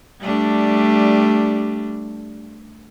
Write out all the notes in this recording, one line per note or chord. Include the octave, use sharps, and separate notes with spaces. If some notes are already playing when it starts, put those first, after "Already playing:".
G3 A3 D4